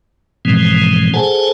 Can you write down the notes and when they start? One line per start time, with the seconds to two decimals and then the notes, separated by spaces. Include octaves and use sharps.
0.45 G#2 B2 E3 F3 G#3 C4
1.13 G#4 A4 C5 F#5 G#5 A5